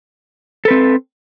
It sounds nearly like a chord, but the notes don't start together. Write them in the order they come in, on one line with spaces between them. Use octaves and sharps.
A4 B4 C4